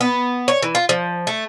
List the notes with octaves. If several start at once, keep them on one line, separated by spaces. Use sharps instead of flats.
B3
C#5
E3
F4
F3
A3